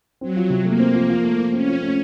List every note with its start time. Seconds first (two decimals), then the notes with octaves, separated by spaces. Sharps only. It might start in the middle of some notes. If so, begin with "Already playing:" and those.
0.21 F#3 C4
0.36 F3
0.50 C3
0.65 A3 A#3
0.79 C4
0.94 F3
1.09 F3
1.24 A3
1.38 F3
1.53 C4 C#4
1.68 F3
1.82 A3